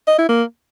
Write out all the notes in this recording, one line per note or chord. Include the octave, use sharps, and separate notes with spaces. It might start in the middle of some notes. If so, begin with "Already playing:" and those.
D#5
E4
A#3